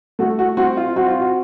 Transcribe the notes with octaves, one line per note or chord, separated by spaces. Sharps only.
A3 F#4
F#4
C4 F#4
F4
C4 F#4
F4
F#4